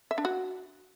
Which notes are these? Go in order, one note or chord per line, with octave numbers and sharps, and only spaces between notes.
E5
D4
F#4